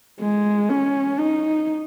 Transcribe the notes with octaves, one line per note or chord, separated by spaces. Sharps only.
G#3
C#4
D#4